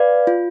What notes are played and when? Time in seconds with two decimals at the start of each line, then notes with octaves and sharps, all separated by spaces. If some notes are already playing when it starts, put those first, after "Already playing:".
Already playing: B4 D5 F5
0.27 F4